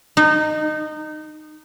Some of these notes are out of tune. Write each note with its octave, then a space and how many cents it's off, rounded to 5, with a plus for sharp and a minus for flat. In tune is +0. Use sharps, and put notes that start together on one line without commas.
D#4 -20